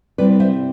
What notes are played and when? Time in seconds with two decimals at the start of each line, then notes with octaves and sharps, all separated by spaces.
0.18 C3 G3 C4 E4 B4 D5
0.40 C5 E5